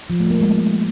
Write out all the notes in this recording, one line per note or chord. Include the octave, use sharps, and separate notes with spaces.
F3
A3
A#3
G#3